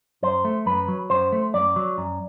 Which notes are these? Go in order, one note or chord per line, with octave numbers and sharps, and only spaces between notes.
F#2 C5
A3
F#2 B4
F#3
F#2 C5
A3
F#2 D5
F#3
F#2